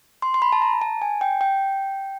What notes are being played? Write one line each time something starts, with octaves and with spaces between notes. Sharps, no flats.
C6
C6
B5
A5
A#5
A5
G#5
G5
G5